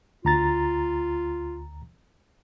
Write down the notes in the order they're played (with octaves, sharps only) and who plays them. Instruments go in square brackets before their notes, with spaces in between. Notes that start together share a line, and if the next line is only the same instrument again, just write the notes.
[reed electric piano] D2 A#5 A6 [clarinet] F4